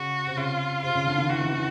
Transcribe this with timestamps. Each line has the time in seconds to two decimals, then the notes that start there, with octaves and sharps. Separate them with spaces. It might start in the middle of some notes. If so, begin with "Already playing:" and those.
Already playing: C#3 F#4
0.27 C3
0.37 C#3 F4
0.83 C3 F4
0.95 C#3
1.06 D3
1.18 D#3
1.29 E3 F#4
1.41 E3
1.52 E3